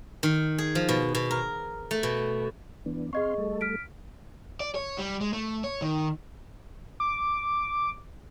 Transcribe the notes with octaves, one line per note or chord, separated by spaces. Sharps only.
D#3
G#4
F3
B2
B2
A#4
A3
B2
E3 B3 D4
C4 G#4 D#5 F5 C6 C#6
G3 A3 A4
F6 B6 D7
D5
C#5
G3
G#3
A3
C#5
D#3
D6